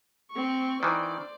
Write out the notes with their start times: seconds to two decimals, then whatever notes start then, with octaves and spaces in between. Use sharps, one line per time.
0.31 C4 C#6
0.83 D#3 E3 C5 D5